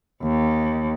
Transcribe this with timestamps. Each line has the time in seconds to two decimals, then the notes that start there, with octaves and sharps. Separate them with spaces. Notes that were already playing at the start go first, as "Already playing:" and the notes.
0.23 D#2